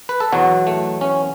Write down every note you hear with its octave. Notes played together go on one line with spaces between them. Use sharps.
B4
A4
E2 B2 F#3 F#4
A3
C#4